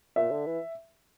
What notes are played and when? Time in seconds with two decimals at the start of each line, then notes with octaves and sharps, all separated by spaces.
0.16 A#2 E5
0.31 D3
0.46 E3